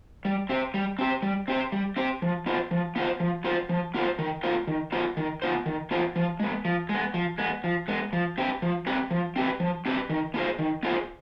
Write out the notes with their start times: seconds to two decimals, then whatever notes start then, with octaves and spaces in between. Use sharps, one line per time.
0.25 G3
0.49 C4 G4 C5
0.74 G3
0.99 C4 G4 C5
1.22 G3
1.48 C4 G4 C5
1.72 G3
1.96 C4 G4 C5
2.22 F3
2.46 B3 F4 C5
2.71 F3
2.96 B3 F4 C5
3.20 F3
3.44 B3 F4 C5
3.69 F3
3.94 B3 F4 C5
4.19 D#3
4.43 B3 F4 C5
4.67 D#3
4.92 B3 F4 C5
5.17 D#3
5.42 B3 F4 C5
5.66 D#3
5.91 B3 F4 C5
6.16 F3
6.40 G#3 B3
6.65 F3
6.89 G#3 B3
7.14 F3
7.38 G#3 B3
7.64 F3
7.88 G#3 B3
8.13 F3
8.38 C4 G4 B4
8.62 F3
8.87 C4 G4 B4
9.11 F3
9.36 C4 G4 B4
9.60 F3
9.86 C4 G4 B4
10.10 D#3
10.34 B3 F4 G#4 C5
10.59 D#3
10.83 B3 F4 G#4 C5